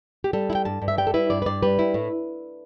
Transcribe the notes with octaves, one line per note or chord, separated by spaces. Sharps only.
G4
G3 A4
E4
G5
G2 A5
G2
E5
G3 G5
A4
E4 B4
G2 D5
B4
G2 D5
G3 B4
E4
A2